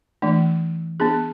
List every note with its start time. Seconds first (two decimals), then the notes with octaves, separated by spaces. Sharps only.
0.22 E3 A3 D4
1.00 B3 D4 G#4